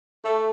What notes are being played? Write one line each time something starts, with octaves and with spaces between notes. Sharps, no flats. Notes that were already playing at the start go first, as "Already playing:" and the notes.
A3